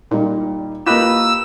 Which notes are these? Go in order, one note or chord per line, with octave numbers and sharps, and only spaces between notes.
A#2 G3 D#4
A#3 F4 G4 B4 D#5 E6